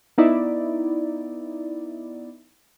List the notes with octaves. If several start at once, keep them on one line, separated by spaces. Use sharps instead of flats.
B3 D#4 E4 D5